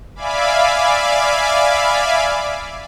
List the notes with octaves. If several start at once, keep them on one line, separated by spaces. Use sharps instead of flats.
D5 E5 F5 G#5 B5 D6